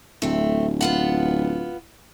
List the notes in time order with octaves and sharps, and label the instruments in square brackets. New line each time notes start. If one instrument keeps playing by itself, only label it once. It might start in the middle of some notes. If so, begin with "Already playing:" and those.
[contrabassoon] D1 [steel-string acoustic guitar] A3 C4
[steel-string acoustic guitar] B3 F4 F#5